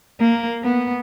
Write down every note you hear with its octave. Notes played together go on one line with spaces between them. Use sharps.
A#3
B3